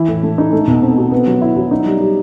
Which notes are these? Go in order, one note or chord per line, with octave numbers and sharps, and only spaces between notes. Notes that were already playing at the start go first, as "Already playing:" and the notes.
Already playing: E3 E4
A2
A3
D#4
A3
B2
C4
F#4
B3
F#3
E4
F#3
D#4
G3
G4